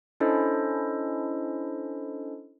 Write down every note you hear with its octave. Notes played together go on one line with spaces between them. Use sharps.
C#4 D4 E4 A4 C5 D#5